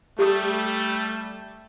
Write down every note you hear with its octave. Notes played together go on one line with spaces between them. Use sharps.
G3 A3 G4 D#6